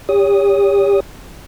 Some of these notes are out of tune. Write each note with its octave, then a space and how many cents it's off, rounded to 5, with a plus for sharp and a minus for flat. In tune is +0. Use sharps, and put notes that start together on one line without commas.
G4 +30 C#5 +30 D#6 +0